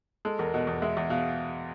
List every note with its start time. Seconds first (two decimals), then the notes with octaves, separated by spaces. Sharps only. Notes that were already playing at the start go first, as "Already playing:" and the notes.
0.25 G#3 A4
0.39 E2 A#4
0.54 B2 D#5
0.67 E2
0.82 G#3 E5
0.97 E2
1.10 B2 F5